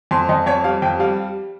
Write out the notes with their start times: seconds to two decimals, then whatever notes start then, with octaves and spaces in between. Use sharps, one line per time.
0.11 F2 C6
0.29 F2 D#5
0.46 F2 C#5
0.64 G3 F5
0.82 F2 G5
1.00 G3 F5